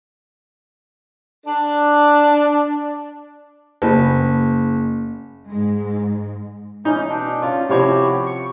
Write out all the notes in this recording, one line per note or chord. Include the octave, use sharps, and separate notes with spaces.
D4
F#1
G#2 G#3
E3 C#4 D#4 G6
B2 D4
C#4 F4
C3 F3 E4 F#4 G4 C#5
C#6